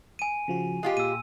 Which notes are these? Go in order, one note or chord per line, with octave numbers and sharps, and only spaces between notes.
G#5 D#7
C#3 F3 F#4
G#3 F4 G4
A#2 E6 D#7